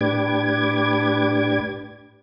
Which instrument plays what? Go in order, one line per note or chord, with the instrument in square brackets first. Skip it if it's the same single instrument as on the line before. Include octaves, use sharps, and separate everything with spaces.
[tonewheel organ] A2 D4 G4 B4 D6 G#6